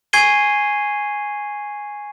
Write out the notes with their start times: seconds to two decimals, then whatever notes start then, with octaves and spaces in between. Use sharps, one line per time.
0.13 G#5 C#6 G#6 C7 D#7 G7